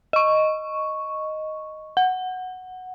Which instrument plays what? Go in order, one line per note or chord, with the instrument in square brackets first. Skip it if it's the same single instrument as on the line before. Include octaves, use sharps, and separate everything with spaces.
[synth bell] D#5 C#6
F#5